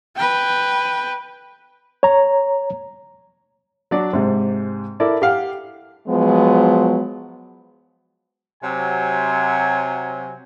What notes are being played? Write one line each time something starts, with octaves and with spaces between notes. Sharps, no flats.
B4 G5
C#5 A#5
F#3 D4 F#4 D5
G#2 C3
E4 A4 A#4 D5
G4 F5 F#5
F3 F#3 G#3 B3
C3 F#3 G#5